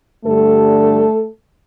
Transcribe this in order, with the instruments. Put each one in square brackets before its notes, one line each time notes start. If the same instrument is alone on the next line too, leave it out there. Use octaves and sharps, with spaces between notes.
[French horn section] G2 D3 G3 A3 D4 A4